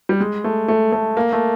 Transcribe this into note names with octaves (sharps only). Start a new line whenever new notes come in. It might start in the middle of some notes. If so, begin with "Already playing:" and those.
G3
G#3
A3
A3
A3
A#3
A3